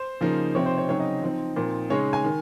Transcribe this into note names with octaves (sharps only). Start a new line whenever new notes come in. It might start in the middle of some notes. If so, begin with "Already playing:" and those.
Already playing: C5
C#3 F3 A#3 D#4
C3 F3 C4 D#4 C#5
C5
C#5
C#3 F#3 C4 D#4 C#5
D#5
F3 C4 D#4
A#2 F3 C4 D#4
C#3 G#3 D#4 C#5
G#5
D#3